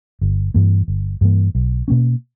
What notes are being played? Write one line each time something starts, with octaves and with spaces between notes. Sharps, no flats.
G1
G2 E3 A#3
G1
G2 E3 A#3
B1
B2 A#3 C#4